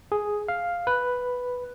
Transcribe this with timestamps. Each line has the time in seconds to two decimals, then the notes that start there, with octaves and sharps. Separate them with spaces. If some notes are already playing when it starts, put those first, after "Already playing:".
0.12 G#4
0.48 F5
0.87 B4